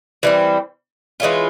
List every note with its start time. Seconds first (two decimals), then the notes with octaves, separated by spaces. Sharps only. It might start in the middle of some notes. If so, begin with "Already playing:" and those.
0.23 E3 G3 C4
1.20 E3 G#3 C#4 F4